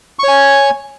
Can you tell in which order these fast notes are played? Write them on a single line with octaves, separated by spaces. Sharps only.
C#6 C#5 G#5